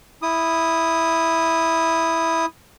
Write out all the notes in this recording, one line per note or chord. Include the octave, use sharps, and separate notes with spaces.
E4 D#6